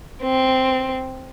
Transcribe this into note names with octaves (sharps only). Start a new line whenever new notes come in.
C4